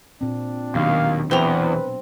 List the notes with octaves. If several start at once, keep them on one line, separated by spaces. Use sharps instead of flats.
A#2 C4 D4
D#2 B2 F#3 D4 F5
E2 C4 B4 A#5